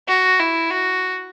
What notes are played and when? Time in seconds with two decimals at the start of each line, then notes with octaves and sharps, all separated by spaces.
0.08 F#4
0.39 E4
0.70 F#4